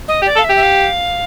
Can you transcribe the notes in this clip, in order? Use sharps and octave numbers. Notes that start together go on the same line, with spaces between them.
D#5
G4
D5
A4
F5
E5
G4
E5
F5